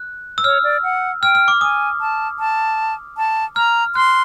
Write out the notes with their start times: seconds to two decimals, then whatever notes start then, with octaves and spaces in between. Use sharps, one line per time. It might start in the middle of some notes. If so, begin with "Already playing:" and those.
Already playing: F#6
0.38 E6
0.44 C#5 F6
0.64 D5
0.83 F#5
1.22 G5 F6
1.35 F6
1.48 D6
1.61 G#5 D#6
2.01 A5
2.39 A5
3.17 A5
3.56 A#5 F6
3.95 C6 F#6